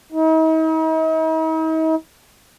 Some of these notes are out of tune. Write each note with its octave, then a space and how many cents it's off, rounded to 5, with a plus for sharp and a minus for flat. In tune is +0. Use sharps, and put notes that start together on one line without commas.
D#4 +45